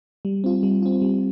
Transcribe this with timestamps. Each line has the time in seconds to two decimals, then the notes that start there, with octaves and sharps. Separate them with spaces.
0.25 G3
0.44 C4 F4
0.63 G3
0.82 C4 F4
1.02 G3